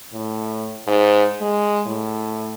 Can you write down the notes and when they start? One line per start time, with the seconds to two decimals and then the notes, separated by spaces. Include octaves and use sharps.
0.13 A2
0.87 G#2
1.41 G#3
1.86 A2